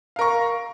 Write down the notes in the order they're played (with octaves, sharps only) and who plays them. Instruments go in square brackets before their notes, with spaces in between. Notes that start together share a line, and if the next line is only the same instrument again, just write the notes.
[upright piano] F5
A#4
C#6